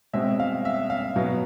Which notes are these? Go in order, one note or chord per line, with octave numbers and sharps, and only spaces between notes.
B2 G#3 C4 E5
F5
E5
F5
B2 F#3 B3